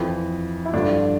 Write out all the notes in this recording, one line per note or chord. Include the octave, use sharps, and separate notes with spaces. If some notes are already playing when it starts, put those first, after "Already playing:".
Already playing: F2 E3
E4
G2 D3 F3 D4